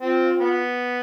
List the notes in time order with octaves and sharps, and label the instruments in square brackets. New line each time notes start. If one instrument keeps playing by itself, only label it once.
[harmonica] C4 [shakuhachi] F4
[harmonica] B3